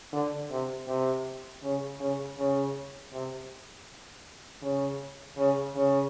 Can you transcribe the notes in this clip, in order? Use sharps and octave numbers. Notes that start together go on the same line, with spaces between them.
D3
C3
C3
C#3
C#3
C#3
C3
C#3
C#3
C#3